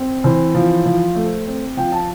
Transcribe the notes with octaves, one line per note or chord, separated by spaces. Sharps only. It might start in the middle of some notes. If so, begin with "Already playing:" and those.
Already playing: C4
E3 C5
F3
F3
A3
C4
F3 G5
A5